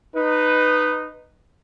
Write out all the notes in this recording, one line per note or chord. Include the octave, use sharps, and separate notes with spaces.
D#4 B4